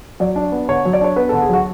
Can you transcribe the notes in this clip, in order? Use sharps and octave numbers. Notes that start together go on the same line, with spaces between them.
F#3 D5
D4
B3
D3 C#5
F#3
D5
D4 C#5
B3 B4
D3 A4
G#4
F#3 F#4